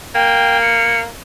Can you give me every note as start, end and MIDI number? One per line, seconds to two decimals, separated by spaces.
0.15 1.07 58
0.15 0.60 79
0.62 0.99 97